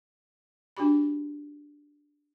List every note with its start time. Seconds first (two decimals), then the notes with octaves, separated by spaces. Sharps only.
0.77 D4 F#4 G4 B5